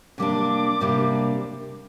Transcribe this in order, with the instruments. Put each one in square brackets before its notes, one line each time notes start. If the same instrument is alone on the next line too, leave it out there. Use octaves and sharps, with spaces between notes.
[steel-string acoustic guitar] C3 G3 A#3 D4 [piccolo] D6
[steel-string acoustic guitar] C3 G3 A#3 D4